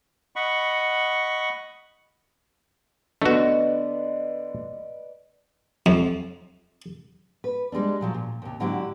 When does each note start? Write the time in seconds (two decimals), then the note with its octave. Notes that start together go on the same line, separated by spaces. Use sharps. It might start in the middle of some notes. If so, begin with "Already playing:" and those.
0.36 D#5 F#5 B5 C#6
3.22 D3 A3 B3 F#4 B4 D5 D#5
5.86 F2
7.44 B4
7.72 G3 G#3 C4 D4
8.01 A#2 F3 F#3
8.14 A#2
8.42 D#2 C3
8.60 G#2 D3 F#3 D4 E4 G4